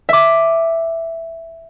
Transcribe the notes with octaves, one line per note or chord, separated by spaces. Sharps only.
E5 D6